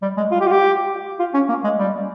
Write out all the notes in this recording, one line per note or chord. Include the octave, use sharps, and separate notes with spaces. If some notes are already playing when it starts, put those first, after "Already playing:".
G3
G#3
F4
G4
F4
G4
F4
C#4
A#3
G#3
G3